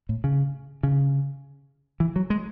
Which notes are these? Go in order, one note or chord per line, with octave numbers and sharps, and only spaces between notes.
A2
C#3
C#3
E3
F#3
G#3